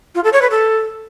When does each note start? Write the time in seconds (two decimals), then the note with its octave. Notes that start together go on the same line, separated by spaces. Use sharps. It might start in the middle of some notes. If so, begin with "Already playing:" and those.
0.15 F4
0.24 A4
0.33 C#5
0.42 B4
0.51 A4